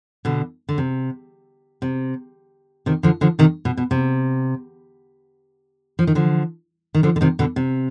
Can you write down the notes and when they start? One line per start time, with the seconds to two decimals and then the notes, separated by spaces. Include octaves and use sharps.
0.25 B2 D3
0.69 D3
0.78 C3
1.82 C3
2.86 C3 D#3
3.03 D3 F3
3.21 D3 F3
3.39 C3 D#3
3.65 B2
3.77 B2
3.91 C3
5.99 F3
6.07 D#3
6.15 D3 F3
6.95 D#3
7.03 D3 F3
7.16 D3
7.21 C3 D#3
7.39 B2 D3
7.56 C3